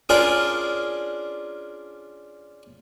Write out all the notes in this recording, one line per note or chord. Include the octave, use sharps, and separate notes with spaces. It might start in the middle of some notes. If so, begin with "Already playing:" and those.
C#4 D4 F4 G#4 A#4